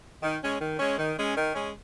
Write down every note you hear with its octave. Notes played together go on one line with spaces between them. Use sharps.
D#3
G#3 C#4
D#3
G#3 C#4
D#3
G#3 C#4
D#3
G#3 C#4